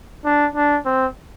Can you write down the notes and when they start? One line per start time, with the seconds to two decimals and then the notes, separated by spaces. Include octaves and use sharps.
0.25 D4
0.56 D4
0.85 C4